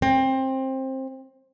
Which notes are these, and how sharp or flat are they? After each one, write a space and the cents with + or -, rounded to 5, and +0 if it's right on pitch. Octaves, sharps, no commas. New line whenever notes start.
C4 +20